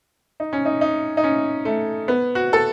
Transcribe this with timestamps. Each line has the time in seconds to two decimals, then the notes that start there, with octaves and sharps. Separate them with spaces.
0.40 D#4
0.53 C#4
0.65 D#4
0.81 D#4
1.17 D#4
1.24 C#4
1.65 A3
2.08 B3
2.35 F#4
2.53 A4